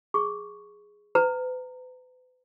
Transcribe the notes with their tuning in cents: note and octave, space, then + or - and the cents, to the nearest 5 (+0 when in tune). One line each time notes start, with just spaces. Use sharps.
G#4 +0 C#6 +0
B4 +40 A#5 -20